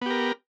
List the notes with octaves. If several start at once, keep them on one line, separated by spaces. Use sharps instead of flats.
B3 G4 A#4